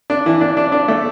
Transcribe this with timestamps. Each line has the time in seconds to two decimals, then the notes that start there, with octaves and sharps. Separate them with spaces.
0.10 D4
0.26 E3
0.41 D4
0.57 D4
0.72 D4
0.88 A3